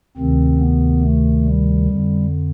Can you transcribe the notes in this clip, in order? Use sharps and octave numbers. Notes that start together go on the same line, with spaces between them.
D2 C3 D#3 C4
B3
A3
G3
F2 D3